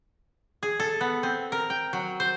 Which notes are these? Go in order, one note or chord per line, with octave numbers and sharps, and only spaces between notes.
G#4
A4
B3
C4
A#4
G5
F#3
C5